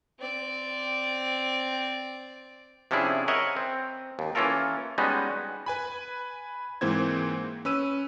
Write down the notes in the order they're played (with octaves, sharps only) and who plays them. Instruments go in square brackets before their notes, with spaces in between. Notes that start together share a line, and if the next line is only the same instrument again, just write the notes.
[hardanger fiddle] C4 D5
[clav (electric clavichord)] C3 F3 C#4 D4 E4 G#4
A#4 C#5 D#5 E5 F#5
C4
D#2
E3 A#3 C#4 F4 A4 A#4
G3 G#3 B3 C#4 D#4 F#4
[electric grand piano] B4 G#5 B5
G#2 E3 A#3 C4 C5 G#6
C#4 B4 E6 D#7